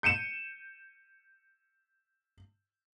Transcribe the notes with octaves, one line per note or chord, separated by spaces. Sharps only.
G6 C#7 D#7 E7